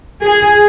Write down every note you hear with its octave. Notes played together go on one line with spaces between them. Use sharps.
G#4